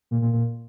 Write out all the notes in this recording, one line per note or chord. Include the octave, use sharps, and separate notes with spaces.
A#2
A#2
A#2